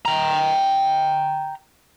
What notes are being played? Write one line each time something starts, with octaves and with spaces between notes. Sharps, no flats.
G5 A#5